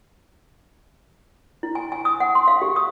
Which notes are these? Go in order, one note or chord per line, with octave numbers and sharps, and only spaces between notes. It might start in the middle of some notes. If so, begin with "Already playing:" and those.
E4
G#5
G#5
D#6
F#5
C6
F5
G4
D#6